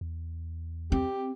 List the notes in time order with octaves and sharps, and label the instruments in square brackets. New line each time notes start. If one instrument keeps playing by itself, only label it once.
[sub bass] E2
[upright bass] C4 [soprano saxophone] G4